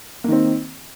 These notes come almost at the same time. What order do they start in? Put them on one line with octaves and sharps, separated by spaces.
A#3 D#3 C4